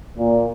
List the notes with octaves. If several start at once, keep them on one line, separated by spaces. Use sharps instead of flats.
A#2